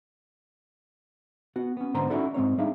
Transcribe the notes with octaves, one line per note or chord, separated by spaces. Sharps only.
B3 F#4
B3 C#4
G#2 D3 B3 C5 A#5
C#4 D#4 E4 F#4 A4 D5
G#2 E3 C4 C#5
G3 D4 D#4 G#4 E5 F5